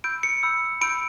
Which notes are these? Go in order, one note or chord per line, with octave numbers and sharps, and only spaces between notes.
B5 E6 G6 D7
C#7
B5 E6 G6
B5 E6 G6 D7